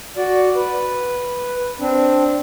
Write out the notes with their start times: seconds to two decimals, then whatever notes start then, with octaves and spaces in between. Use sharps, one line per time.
0.17 F#4 D5
0.56 B4
1.80 C4 D4